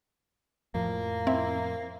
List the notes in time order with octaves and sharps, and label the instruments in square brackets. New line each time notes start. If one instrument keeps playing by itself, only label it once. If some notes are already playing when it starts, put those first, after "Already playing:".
[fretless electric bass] F2 A2 F3 [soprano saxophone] A#3
[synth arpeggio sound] C4 [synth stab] E4